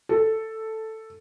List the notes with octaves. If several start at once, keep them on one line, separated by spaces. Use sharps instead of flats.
A4